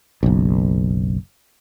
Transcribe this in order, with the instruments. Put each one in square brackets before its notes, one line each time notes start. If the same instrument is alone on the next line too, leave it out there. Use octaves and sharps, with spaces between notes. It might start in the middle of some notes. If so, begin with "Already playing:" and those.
[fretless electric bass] F#1 B1